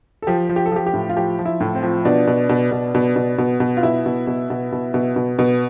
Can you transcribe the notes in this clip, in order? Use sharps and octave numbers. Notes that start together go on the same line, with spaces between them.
A4
F3 G4
F3
G4
A4
F3 G4
G4
A2
F4
F3 G4
F3
E4
A2
C4
F3
B2 D4
B2
B2
B2
B2
B2
B2
B2
F4
B2 E4
B2
B2
B2
B2
B2
B2
B2